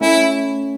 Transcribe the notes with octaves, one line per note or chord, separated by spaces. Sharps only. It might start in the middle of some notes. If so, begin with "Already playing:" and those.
A3 C#4 E4